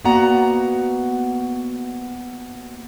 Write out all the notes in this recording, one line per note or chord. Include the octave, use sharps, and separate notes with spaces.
A#3 B3 F#4 D5 F#5 A#5